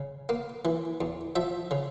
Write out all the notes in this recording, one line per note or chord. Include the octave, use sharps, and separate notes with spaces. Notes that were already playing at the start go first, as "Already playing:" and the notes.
Already playing: C#3
A#3
E3
E2
F3 E5
C#3